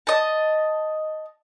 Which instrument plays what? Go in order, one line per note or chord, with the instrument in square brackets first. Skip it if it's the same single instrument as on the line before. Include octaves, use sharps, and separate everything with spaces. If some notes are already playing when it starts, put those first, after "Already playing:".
[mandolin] D#5 A5